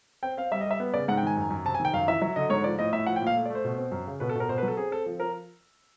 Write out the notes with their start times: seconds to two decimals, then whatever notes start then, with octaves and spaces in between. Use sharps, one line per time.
0.23 C4 G5
0.37 C4 F5
0.51 G3 E5
0.61 D#5
0.66 G3 E5
0.80 B3
0.94 C#3 D5
1.08 G#2 F#5
1.17 G5
1.23 D#3 G#5
1.37 F#2
1.50 F#2
1.65 C3 A5
1.74 G#5
1.80 D#3
1.85 G5
1.93 F#2 F5
2.08 E3 E5
2.22 F#3 E5
2.36 D3 D#5
2.50 G#2 C#5
2.64 F3 D5
2.79 A2 D#5
2.93 A2 E5
3.06 F3 F#5
3.16 G5
3.21 A#2
3.27 F5
3.35 A3
3.46 D5
3.50 A3
3.55 C5
3.64 B2
3.77 C4
3.92 F#2
4.07 C#3
4.20 B2 B4
4.29 A4
4.35 B2
4.40 A#4
4.49 B2 C5
4.58 B4
4.63 F#3
4.68 A4
4.77 C4 G#4
4.91 C4 A4
5.06 F3
5.19 F3 A#4